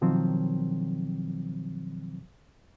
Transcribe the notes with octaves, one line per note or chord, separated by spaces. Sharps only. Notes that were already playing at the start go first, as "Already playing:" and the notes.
B2 D#3 F3 F#3 C4